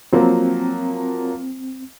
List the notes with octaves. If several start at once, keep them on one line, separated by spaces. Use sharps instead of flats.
F3 F#3 A#3 C4